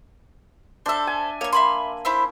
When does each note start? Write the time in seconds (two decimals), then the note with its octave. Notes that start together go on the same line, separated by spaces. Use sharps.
0.86 D4 A4 C5 E5
1.07 G#5
1.41 A#3 C#5 C#6
1.53 E5 B5 C6
2.05 E4 C5 E5